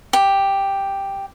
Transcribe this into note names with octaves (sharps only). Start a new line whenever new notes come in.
G4